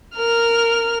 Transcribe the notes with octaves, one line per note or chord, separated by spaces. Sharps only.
A#4 F6